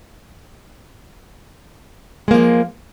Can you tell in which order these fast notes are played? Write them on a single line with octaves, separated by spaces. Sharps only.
G#3 A#3 F3